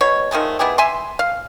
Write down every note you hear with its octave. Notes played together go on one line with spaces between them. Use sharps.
B2 C#5
D#3 F3 G#3 A3
B3 E4 G4 G#4
E5 G#5 C6
F5